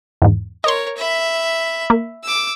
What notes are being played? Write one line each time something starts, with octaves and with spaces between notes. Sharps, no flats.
E2 G#2
A#4 C#5 D#5 C6
E5 B5
A#3
D6 E6